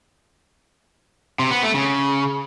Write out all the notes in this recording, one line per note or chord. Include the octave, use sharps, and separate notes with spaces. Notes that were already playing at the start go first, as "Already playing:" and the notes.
C3
B3
A3
C#3